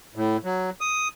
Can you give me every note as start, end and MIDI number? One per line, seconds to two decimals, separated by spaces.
0.16 0.37 45
0.45 0.70 54
0.81 1.08 87